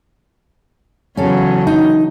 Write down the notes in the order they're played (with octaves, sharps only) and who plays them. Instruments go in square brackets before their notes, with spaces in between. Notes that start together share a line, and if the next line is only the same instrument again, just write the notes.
[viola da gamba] E2 C#3 F#3 [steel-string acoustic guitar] C#4 A4
[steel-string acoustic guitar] D#4